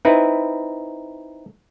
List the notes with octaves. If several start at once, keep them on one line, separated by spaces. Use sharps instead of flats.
C4 D#4 E4 B4